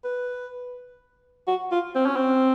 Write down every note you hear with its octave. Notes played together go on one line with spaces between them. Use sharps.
B4
F#4
F4
C4
C#4
C4